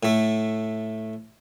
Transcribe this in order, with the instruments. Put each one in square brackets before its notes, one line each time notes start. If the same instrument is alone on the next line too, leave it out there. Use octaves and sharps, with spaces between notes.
[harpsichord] A2 A3